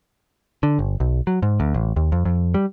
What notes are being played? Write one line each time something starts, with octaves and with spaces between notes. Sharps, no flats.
D3
G1
B1
F#3
G#2
D2
A1
D#2
F2
F2
G3